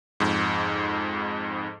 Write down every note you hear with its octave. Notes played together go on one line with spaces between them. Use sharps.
F2 G#2